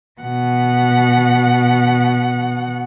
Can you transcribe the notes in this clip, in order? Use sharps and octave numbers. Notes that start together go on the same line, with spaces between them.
B2 F#5